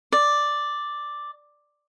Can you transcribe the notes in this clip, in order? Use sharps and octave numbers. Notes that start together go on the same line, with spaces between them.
D5